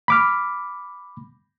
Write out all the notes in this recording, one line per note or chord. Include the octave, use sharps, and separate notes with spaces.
B5 D6 F6